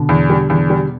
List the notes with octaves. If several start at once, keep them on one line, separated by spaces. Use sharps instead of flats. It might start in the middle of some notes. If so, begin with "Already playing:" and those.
Already playing: B2 D3
E2
G3
E2
G3